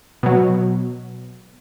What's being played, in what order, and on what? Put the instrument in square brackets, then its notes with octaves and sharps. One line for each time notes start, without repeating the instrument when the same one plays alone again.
[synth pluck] B2 F#3